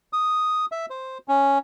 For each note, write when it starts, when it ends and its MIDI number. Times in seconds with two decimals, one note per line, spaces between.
0.13 0.65 87
0.72 0.86 76
0.90 1.18 72
1.28 1.58 61